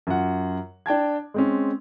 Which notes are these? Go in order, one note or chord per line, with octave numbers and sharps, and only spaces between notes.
F#2 F4 F#5
D4 G5 A5 G#6
G#3 C4 C#4